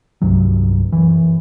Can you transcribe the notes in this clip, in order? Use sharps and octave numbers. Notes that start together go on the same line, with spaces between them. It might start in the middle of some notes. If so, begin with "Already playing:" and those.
C2 G2 C3 F#3
F#2 E3